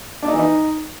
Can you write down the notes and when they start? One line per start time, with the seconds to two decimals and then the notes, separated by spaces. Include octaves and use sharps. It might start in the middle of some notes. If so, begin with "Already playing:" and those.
0.22 D4
0.28 D#4
0.33 E3
0.39 D#4